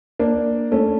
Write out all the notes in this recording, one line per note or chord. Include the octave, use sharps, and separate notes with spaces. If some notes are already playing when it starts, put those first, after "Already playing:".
A#3 D4
A3 C#4